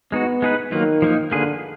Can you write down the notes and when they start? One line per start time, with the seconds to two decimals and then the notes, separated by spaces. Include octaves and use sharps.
0.12 G#3 B3 D#4 F#4
0.42 G#3 D#4 G#4 B4
0.72 D#3 F#3 A#3 F4
1.02 F3 A#3 D#4
1.32 D3 A#3 F4 G#4 B4